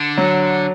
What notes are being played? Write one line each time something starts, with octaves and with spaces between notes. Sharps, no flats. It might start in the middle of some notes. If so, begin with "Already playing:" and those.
Already playing: D3
F#3